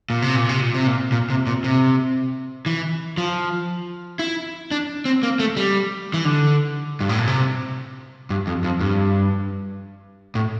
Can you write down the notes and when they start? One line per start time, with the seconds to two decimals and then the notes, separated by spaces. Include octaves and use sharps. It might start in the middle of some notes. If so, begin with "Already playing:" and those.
0.10 A#2
0.22 C3
0.36 A#2
0.49 C3
0.61 A#2
0.74 C3
0.87 A#2
1.12 A#2
1.30 C3
1.47 A#2
1.64 C3
2.66 E3
3.17 F3
4.19 E4
4.71 D4
5.05 C4
5.23 A#3
5.39 A3
5.57 G3
6.14 E3
6.25 D3
7.01 G2
7.09 A2
7.19 A#2
7.27 C3
8.30 G2
8.47 F2
8.64 F2
8.81 G2
10.35 A2